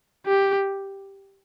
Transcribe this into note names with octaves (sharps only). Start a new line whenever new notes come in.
G4